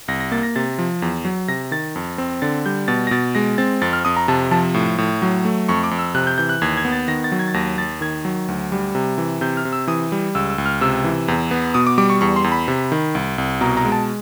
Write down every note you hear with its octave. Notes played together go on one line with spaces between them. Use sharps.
C2 A#6
A#6
A#3 A6
A#6
C3 A6
F3
E2
F#3
C3 A#6
D#3 A6
F2
C4
D3 A6
G3 G6
B2 A6
A#6
B2 A6
G#3 A#6
C4 A6
F2 A6
F6
F2 D#6
A#5
C3 A5
F3 A5
A2
A2
F#3
A3
F2 C#6
D6
F2
E6
C3 F#6
G6
E3 G6
F#6
D#2 G#6
G#6
B3
A6
D#3 A#6
A6
F#3
G#6
A6
D#2 A#6
D#2 A6
D#3 G#6
F#3
D2
G3
C3
E3
C3 G6
F6
C3
E6
E3 D#6
G3
C#2 E6
E6
C#2
F6
C3 E6
E3
E2
B3
B2 D#6
D6
G3 D6
C#6
E2 C#6
C6
E2
B5
C3
D#3
C2
C2
B2 A#5
A#5
G#3
A5